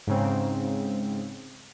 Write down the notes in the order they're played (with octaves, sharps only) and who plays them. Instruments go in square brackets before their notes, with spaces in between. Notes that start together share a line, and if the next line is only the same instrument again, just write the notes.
[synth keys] G#2 C#3 C4